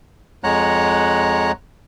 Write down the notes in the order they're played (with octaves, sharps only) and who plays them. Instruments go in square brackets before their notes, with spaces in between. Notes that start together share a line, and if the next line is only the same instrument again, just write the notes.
[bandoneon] F2 G#3 C#5 F#5 A#5 F#6